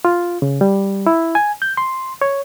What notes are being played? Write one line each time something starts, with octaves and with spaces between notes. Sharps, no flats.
F4
C#3
G3
E4
G#5
G6
C6
C#5